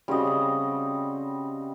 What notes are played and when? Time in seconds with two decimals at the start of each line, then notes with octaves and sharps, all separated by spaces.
0.08 C#3 G3 C4 F#4 D#5